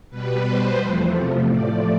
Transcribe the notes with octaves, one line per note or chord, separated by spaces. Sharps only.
B2 G3 B4
C5
E2 C3 F3 A3
A2 F3 A3 D5